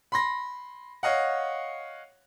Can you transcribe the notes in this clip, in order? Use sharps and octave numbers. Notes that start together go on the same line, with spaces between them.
B5 C6 A#6
C#5 D#5 F5 F#5